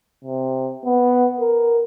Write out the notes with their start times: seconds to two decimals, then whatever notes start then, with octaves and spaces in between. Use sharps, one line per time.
0.24 C3
0.85 B3
1.40 A#4